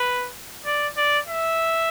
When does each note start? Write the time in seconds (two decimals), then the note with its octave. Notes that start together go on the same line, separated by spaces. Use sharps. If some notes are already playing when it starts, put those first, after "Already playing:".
Already playing: B4
0.66 D5
0.97 D5
1.28 E5